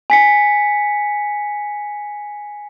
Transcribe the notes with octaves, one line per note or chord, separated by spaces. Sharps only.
G#5 B6 C#7